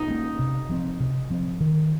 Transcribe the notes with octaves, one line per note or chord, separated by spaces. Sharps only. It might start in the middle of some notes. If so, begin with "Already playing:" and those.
Already playing: D#4
A#3 C#4
C3
F3 C4
C3
F3 C4
D#3